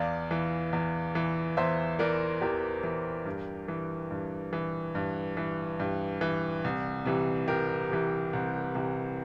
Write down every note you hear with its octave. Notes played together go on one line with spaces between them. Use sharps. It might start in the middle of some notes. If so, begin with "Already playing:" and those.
Already playing: E2 D5 F5
E3
E2
E3
E2 C5 E5
E3 A#4 D5
E2 G4 A#4
E3
G2
E3
G2
E3
G2
E3
G2
E3
C2
C3 E3
C2 G4 A#4
C3 E3
C2
C3 E3